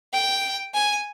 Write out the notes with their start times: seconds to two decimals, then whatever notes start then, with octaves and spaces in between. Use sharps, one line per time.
0.13 G5
0.73 G#5